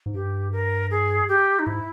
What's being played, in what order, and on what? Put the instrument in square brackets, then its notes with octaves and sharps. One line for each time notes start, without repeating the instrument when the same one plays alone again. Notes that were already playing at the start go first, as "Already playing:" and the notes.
[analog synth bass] G#2
[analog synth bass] G2 [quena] G4
[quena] A#4
G#4
G4
D#4
[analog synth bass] G#2 [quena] E4